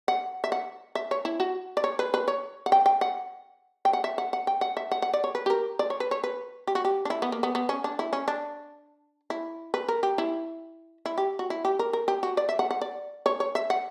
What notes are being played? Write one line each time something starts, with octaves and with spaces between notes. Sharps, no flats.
F#5
E5
F#5
E5
C#5
E4
F#4
D5
C#5
B4
B4
C#5
F#5
G5
G5
F#5
G5
F#5
E5
F#5
F#5
G5
F#5
E5
F#5
F#5
D5
C#5
B4
G4
A#4
D5
C#5
B4
C#5
B4
G4
F#4
G4
D4
E4
B3
A#3
B3
B3
C#4
D4
E4
C#4
D4
E4
B4
A#4
G4
E4
E4
G4
F#4
E4
G4
A#4
A#4
G4
F#4
D5
E5
F#5
F#5
D5
C#5
C#5
E5
F#5